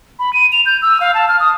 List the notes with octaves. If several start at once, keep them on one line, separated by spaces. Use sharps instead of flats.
B5
D#7
F7
G6
E6
F5
A5
F6
D#6